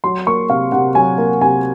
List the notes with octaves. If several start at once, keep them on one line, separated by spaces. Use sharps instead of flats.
F#3 C6
A#3 C#6
C3 F5
C3 F#5
F#3 G#5
A#3
C3 G#5